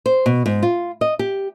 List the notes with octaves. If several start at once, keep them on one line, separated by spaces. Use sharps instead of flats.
C5
B2
G#2
F4
D#5
G4